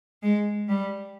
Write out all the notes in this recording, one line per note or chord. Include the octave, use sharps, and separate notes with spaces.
G#3
G3